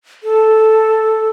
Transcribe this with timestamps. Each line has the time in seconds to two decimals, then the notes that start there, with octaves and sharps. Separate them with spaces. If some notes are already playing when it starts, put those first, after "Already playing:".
0.23 A4